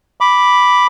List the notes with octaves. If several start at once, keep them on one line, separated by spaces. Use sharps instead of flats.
B5 D6